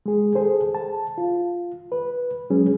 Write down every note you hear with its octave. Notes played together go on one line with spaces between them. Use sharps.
G#3 G#4
G#4 A4 C5
A5
F4
B4
F#3 G#3 C#4 G#4